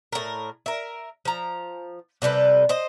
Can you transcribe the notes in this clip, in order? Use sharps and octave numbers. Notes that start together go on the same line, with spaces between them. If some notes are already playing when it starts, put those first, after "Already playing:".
A2 A#4
A#4 E5
F3 A#5
C3 G3 A4 B4
C5 D#5